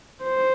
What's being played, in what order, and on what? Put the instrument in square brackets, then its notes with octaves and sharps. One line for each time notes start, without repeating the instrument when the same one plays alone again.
[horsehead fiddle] C5